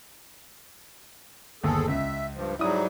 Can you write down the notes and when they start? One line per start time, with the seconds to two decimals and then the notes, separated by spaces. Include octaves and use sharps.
1.64 G1 D#2 G#4 A4
1.88 C#2 E5
2.34 G2 F3
2.59 G#2 F#3 G3 E4 D#6